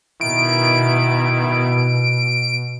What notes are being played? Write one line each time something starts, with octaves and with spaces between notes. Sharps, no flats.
B2 D#3 E4 D7